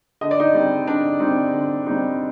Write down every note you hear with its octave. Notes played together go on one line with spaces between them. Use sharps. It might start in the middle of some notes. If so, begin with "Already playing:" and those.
D3 D#5
D5
D#4 D#5
G3 C4 D#4
D3 D4 D5
G3 C4 D#4
D3
G3 C4 D#4